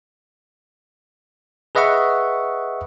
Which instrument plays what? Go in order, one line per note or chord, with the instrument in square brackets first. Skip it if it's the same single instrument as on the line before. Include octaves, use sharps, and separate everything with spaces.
[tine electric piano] G#4 B4 D#5 E5 F#5 C#6